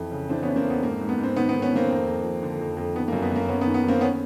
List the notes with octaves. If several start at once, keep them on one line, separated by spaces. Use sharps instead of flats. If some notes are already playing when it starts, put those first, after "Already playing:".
Already playing: F2 E3
C#3
E3 C4 D4
B3 C#4
E3
A#3 C4
F2
B3
G#2 A#3
G#2
B3
G#2
C4
D#3 B3
B3
D#3
B3 C#4
D#3 A#3 C4
F2
F2
F3
D3
F2
F2
D#3 B3
A#3
F#2
B3
F#2 A#3
F#2 B3 C#4
B3
D#3
B3
D#3 A#3 C4
B3 C#4